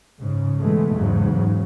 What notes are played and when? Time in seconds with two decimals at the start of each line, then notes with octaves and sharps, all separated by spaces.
0.21 G#2 C#3
0.60 B2 E3 G#3 A3
0.96 E2 G#2 C#3 F#3
1.31 C#3